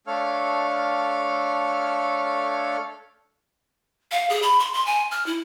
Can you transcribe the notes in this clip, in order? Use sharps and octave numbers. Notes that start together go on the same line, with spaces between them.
A3 D4 A4 C#5 F5 F6
F5
G#4
B5
C6
C6
G#5
F6
E4